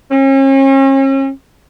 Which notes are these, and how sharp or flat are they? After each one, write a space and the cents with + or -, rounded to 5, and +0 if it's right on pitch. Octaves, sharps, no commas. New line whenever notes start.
C#4 -40